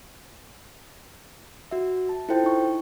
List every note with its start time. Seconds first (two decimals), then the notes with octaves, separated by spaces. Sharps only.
1.71 F#4 E5
2.09 A5
2.29 E4 F4 A4 C5 G5
2.44 D#4 E4 C#6